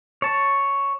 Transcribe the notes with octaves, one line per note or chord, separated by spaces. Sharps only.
C#5 A5